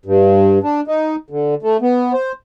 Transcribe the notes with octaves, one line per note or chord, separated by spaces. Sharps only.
G2
D4
D#4
D3
A3
B3
C5